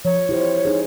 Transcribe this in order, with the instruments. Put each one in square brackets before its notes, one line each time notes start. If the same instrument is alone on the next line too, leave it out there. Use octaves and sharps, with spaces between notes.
[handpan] F3 [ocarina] C#5
[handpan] E4 G4 C5
D#4 G#4